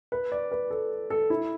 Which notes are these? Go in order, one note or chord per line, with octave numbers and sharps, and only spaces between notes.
B4
D5
B4
A4
A4
E4